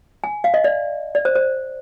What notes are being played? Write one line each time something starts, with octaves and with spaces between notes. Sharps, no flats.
G#5
F5
D#5
D5
D5
C5
C5